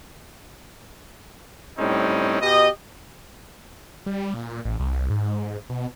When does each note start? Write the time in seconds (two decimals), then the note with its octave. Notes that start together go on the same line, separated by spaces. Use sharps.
1.77 A2 G3 C4 C#4 D#4
2.41 B2 G4 D#5
4.06 G3
4.34 A#2
4.65 A1
4.80 C2
5.10 G#2
5.69 B2